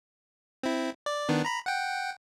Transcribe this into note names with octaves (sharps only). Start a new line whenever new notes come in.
C4 E4
D5
D#3 B3 D4
A#5 B5
F#5 G5